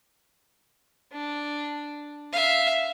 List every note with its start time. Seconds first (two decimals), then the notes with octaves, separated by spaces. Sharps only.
1.12 D4
2.32 E5 F5